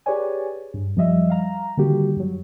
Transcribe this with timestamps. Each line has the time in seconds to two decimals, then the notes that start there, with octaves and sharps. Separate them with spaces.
0.06 G4 G#4 B4 C#5 D5 G#5
0.74 G2
0.96 F#2 F3 G3 D#5 E5
1.30 F5 A#5
1.77 D3 D#3 G3 A#3 F#4 G4
2.16 F#2 F#3